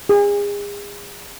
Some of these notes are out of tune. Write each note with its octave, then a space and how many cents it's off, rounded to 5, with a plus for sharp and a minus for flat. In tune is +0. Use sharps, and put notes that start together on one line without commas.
G#4 -35